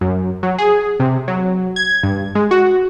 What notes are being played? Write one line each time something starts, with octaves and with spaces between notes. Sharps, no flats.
F#2
F#3
G#4
C3
F#3
G#6
G2
G#3
F#4